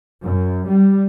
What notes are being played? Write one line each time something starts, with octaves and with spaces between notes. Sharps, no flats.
F#2
G3